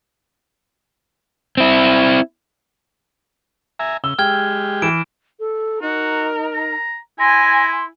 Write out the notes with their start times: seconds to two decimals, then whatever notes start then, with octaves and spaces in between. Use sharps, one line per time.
1.57 C4 E4
3.79 E5 G#5 A#5
4.04 C#3 E6 G7
4.19 G#3 G4 G5 F6 G#6 G7
4.82 E3 D7 E7
5.40 A4
5.82 D#4 F#4 A#4
6.54 A#5
7.20 E4 G#5 C6 A#6